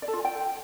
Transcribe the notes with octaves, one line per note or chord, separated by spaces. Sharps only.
D5
A4
F4
G#5
G5